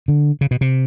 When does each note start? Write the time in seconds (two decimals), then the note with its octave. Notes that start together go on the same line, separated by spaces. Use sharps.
0.08 D3
0.41 C#3
0.51 B2
0.61 C3